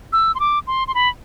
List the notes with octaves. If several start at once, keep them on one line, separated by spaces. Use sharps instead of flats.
E6
C6
D6
C6
C6
B5